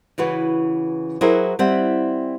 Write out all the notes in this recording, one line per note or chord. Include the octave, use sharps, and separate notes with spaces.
C#3 E3 F#4 B4
F#3 E4 F#4 G#4 A#4 C5
G3 C4 E4 F#5